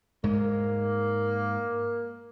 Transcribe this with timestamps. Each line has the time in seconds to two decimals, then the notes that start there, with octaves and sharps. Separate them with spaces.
0.24 G#2 G#3 A#3